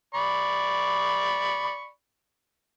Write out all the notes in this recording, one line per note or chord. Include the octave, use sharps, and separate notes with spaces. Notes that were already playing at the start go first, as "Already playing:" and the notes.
D5 B5 C#6